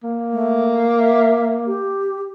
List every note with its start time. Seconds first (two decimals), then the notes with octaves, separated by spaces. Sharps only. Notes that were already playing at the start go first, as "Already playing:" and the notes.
0.03 A#3
0.32 A3
0.99 E5
1.67 G4